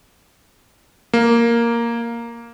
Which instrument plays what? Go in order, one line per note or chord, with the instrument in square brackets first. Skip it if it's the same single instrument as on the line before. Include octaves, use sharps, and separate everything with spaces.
[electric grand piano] A#3